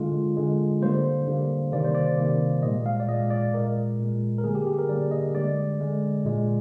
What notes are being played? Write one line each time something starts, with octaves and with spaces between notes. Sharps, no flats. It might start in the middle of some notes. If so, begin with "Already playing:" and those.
Already playing: D3 G#3 F4
D3 G#3
D3 G3 A#3 C5
D3 G3 A#3
C3 D#3 G3 A#3 D5
C5
D5
C3 D#3 G3 A#3
A#2 G#3 D#5
F5
D5
A#2 G#3 D#5
D5
A#2 G#3 A#4
A#2 G#3
A#4
D3 G3 A#3 G#4
G4
G4
A#4
D3 G3 A#3 D5
D#5
D3 G#3 D5
D3 G#3
A#2 G#3